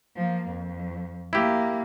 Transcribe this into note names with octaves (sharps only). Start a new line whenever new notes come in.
F3 A#3
F2
A#3 E4 G4